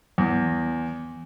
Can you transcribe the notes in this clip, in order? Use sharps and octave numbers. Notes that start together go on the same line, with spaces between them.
E2